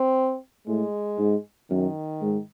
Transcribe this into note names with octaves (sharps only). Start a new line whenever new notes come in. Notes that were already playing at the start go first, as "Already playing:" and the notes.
Already playing: C4
A2 G#3
G#2
F#2 D#3
G#2